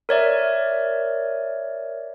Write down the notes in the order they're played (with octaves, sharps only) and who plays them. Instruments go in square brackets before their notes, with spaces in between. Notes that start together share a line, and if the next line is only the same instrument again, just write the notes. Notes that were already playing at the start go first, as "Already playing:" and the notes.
[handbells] A#4 C#5 D5 E5